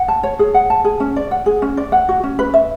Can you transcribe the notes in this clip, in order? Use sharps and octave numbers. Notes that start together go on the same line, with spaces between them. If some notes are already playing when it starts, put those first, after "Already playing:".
Already playing: F#5
A5
C#5
G#4
F#5
A5
G#4
C#4
D5
F#5
G#4
C#4
D5
F#5
F#4
C#4
B4
E5